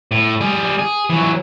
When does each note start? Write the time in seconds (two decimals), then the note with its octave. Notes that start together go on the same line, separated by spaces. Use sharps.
0.11 A2
0.41 G3 G#4
0.79 G#4
1.10 E3 F#3